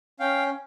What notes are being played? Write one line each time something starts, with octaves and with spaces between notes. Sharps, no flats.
C#4 F5 G5